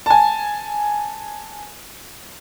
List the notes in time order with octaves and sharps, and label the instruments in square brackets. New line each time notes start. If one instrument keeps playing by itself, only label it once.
[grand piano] G#5 A5